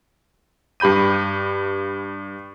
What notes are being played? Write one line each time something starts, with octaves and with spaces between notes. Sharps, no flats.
G2 G4 B5 G6 D#7